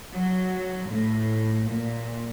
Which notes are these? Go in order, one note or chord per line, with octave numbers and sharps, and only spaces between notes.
F#3
A2
A#2